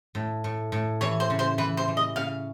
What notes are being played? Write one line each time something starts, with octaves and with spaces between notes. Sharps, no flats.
A2
A2
A2
E3 C#5
C5
C#3
C5
E3 B4
C5
E3
D#5
C#3 F5